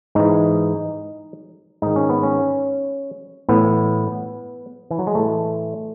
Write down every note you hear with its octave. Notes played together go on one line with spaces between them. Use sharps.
G#2 E3 D#4
G#2 D#3 D#4
C#4
B3
C#4
A2 E3 B3
E3
F#3
G#3
A2 E3 A3